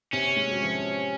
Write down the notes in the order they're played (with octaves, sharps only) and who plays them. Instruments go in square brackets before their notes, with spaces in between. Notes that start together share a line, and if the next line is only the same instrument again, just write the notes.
[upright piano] C3 [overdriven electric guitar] C#4
[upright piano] G#3
F#3
F3